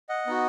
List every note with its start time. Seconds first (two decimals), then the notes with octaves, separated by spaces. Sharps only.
0.09 D#5 F#5
0.26 B3 D#4 F#4